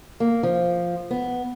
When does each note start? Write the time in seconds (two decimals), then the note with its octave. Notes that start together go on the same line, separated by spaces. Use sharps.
0.20 A#3
0.43 F3
1.11 B3